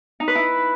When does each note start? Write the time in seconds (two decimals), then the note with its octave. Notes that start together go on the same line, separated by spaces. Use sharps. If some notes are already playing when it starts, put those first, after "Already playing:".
0.20 D#4
0.28 B4
0.35 E4